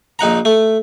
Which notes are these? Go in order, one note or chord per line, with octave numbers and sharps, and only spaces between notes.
A#1 D#4 F#5 A#5
A3